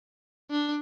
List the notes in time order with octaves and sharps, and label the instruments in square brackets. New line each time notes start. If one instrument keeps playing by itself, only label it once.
[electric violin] D4